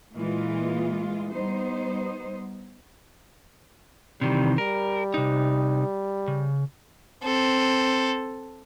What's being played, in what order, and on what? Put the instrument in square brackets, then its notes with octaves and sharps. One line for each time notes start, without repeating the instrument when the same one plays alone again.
[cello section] A#2 E3 G#3 F4
G3 B3 D#4 C5
[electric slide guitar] C3 D#3 E3 [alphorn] G3
[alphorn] G3 [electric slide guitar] A#4
[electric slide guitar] C3 D#4
C#3
[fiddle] C4 A4